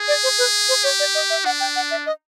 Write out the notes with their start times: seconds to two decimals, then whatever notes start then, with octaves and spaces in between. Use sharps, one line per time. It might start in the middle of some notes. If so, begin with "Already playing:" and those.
Already playing: G#4
0.08 D5
0.23 C5
0.38 B4
0.69 C5
0.83 G4 C#5
1.00 D5
1.15 D#5
1.30 E5
1.45 D4 F#5
1.60 G5
1.76 F#5
1.91 E5
2.06 D#5